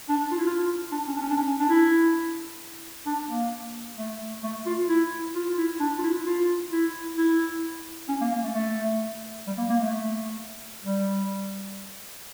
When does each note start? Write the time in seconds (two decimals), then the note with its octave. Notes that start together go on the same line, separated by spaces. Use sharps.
0.09 D4
0.31 F4
0.38 E4
0.46 F4
0.92 D4
1.07 C#4
1.15 D4
1.22 C#4
1.30 D4
1.37 C#4
1.60 D4
1.69 E4
3.06 D4
3.28 A#3
3.98 A3
4.43 A3
4.66 F4
4.89 E4
5.35 F4
5.58 E4
5.80 D4
5.99 F4
6.03 E4
6.27 F4
6.72 E4
7.17 E4
8.09 C#4
8.21 A#3
8.31 A#3
8.44 A3
8.54 A3
9.47 G3
9.58 A#3
9.69 A#3
9.80 A3
10.84 G3